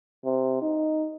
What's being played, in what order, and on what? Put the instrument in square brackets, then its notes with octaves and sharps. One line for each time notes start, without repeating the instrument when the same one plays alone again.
[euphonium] C3
D#4